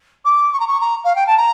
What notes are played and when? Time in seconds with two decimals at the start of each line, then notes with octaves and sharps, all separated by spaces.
0.25 D6
0.53 C#6
0.60 A#5
0.68 C#6
0.81 A#5
1.04 F5
1.16 G5
1.27 A5
1.37 A#5